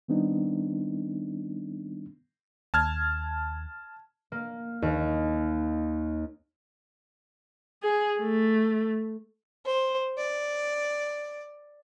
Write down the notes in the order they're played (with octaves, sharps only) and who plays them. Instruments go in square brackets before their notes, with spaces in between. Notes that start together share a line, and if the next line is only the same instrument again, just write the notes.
[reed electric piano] D#3 G3 B3 C4 D4 D#4
[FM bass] D#2 [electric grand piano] A5 F6 G#6
[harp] A#3
D#2
[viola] G#4
A3
[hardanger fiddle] C5
D5